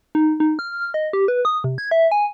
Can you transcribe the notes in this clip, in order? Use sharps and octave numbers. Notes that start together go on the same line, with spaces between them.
D#4
D#4
F6
D#5
G4
B4
D#6
C3
G#6
E5
G#5